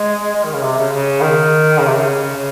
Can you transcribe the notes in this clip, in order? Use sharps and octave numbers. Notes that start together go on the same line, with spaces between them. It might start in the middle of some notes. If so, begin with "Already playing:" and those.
Already playing: G#3
G#3
D#3
C#3
C3
C#3
C#3
D#3
C#3
C3
C#3
C#3